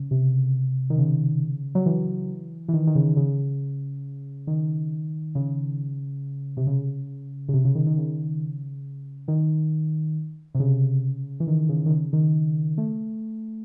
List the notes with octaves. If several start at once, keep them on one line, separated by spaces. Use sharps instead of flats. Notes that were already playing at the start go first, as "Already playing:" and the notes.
Already playing: C#3
C3
D#3
C#3
F#3
E3
E3
D#3
D#3
C#3
C#3
D#3
C#3
C3
C#3
C#3
C3
C#3
D#3
D#3
C#3
D#3
C3
C#3
E3
D#3
C#3
D#3
C#3
D#3
A3